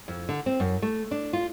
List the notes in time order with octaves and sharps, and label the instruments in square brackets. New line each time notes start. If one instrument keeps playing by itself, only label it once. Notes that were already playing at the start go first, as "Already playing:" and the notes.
[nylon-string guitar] F2
D3
C4
F#2
A3
D4
F4